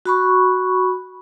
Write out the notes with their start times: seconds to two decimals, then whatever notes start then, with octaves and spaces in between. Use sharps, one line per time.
0.06 F#4 B5 C#6